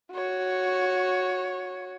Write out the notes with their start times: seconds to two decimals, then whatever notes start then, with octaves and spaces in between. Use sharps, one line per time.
0.12 F#4 C#5